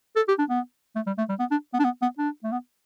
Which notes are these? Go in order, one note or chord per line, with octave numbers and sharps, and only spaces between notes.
A4
G4
D4
B3
A3
G3
A3
G3
B3
D4
B3
D4
B3
B3
D4
A3
B3